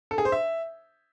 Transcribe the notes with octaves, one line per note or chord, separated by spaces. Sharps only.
A4
G#4
C5
E5